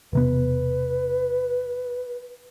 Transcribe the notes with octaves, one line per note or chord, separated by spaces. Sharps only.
E1 C3 B3 B4